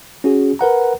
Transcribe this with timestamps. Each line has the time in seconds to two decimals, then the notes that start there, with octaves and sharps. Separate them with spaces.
0.24 C#4 F#4 G#4
0.59 A#4 B4 F#5 A#5